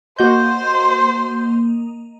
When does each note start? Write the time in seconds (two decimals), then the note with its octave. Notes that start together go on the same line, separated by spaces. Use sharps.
0.18 A#3 F#4 C5 D#5 G6